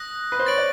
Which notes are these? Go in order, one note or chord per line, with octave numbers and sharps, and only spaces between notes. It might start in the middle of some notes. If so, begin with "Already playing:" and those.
Already playing: D#6 F#6 A#6
B4
C5
C#5 A6 D7 F#7
D5